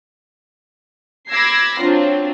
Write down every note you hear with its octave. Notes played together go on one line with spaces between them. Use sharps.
B5 D6 E6 G#6 A#6 C7
F#3 C4 D4 F4